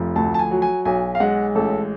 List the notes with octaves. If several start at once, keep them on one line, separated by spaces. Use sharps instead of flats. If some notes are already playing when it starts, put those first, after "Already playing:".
Already playing: F1 F3
D2 A5
A5
G#5
F#3
G#5
B1 G#5
F5
G#3 F#5
A1 A4